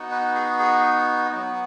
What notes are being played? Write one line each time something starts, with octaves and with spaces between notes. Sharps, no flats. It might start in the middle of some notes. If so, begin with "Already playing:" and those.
Already playing: B3 D#4 F#4
B4
G#4
G#4
F#3 B3 F#4